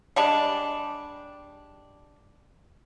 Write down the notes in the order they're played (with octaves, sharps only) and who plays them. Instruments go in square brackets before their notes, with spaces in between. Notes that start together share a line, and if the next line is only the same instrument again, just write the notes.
[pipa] G3 G#3 D4